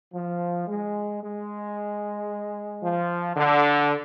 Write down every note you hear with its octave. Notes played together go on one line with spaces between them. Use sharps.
F3
G#3
G#3
F3
D3